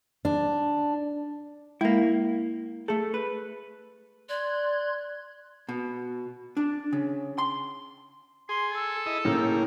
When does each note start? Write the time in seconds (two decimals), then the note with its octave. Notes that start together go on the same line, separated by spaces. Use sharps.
0.25 D4
1.81 G#3 A#3 E4
2.88 A3 G#4 A4
3.14 B4
4.29 D5 C6 F#6 G#6
5.69 B2
6.57 D4
6.93 C#3
7.38 C6
8.49 G#4 C6
8.72 A4
9.06 E4 D#5
9.25 A2 C#3 A#3